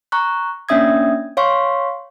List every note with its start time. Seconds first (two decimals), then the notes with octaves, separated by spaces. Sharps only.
0.12 A#5 C#6 F#6
0.69 A#3 C#4 D4 E5 D#6 G#6
1.37 C#5 F5 C6 C#6